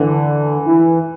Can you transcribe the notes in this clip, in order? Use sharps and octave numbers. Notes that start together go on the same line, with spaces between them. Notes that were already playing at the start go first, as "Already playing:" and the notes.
Already playing: D3 E3
E3